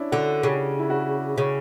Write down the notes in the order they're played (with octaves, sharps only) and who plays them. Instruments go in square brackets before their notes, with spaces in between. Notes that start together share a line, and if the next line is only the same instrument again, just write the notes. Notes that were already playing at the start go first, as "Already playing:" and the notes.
Already playing: [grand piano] C#4 D4 E4
[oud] D3 [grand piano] F#4
[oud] C#3 [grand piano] G4
[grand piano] E4
F#4
[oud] C#3